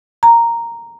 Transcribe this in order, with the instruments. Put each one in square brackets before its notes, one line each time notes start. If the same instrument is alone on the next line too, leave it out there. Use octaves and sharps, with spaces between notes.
[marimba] A#5